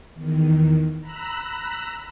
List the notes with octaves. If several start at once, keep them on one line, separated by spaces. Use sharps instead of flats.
E2 D#3
A#5 B5 E6 F#6